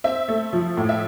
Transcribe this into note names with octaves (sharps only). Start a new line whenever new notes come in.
C4 E5
A3
F3
A2
E5